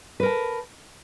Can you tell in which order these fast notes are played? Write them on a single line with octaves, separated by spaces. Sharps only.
B4 A#4 A5